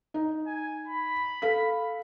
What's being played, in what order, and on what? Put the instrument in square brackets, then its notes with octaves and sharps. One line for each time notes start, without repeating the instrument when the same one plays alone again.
[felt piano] D#4
[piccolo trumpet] G#5
B5
[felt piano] A4 F5 B6